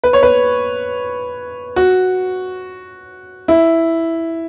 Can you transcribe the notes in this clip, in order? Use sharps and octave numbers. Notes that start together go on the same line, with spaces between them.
B4
C#5
B4
F#4
E4